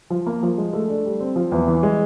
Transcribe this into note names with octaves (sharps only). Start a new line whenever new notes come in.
F3
A#3
F3
G#3
A3
D4
G3
C4
F3
E2
E3
G#3